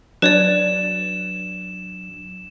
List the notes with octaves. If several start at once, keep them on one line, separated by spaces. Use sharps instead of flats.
F#3 D4 B4 C#5 D5 E7